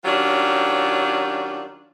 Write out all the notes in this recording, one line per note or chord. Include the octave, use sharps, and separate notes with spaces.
D#3 F#3 C#4 D4 F4 G4